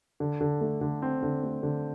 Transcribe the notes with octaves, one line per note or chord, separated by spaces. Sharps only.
D3
D3
A3
D3
C4
D3
A3
D3